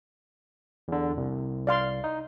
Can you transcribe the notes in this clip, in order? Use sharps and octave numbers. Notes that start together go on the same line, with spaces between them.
E2 D3
C2
D5 F5 C6
D#4